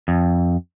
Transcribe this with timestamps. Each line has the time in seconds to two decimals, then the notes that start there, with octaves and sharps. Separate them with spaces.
0.08 F2